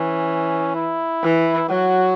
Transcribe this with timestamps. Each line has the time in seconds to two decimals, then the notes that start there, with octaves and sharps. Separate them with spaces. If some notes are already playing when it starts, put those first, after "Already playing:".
Already playing: E3 C#4
0.75 E4
1.23 E3
1.69 F#3 F#4